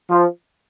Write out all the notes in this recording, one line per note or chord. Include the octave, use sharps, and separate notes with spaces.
F3